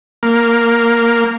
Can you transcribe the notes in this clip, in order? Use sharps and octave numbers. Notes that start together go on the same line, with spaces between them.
A#3